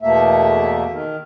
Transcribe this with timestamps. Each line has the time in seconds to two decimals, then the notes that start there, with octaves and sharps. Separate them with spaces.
0.02 E2 B2 A3 A#3 E5
0.90 D#3